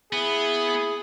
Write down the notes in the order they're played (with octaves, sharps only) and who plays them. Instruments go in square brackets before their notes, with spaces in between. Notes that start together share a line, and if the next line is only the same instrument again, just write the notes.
[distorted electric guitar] B3 [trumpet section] E4 G#4